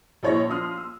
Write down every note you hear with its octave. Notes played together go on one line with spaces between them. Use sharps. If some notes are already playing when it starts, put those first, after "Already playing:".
A#1 E4 C#5 A5 A#6
F3 C6 D#6 F6
E6